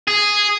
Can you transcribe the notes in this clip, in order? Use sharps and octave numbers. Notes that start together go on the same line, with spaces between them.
G#4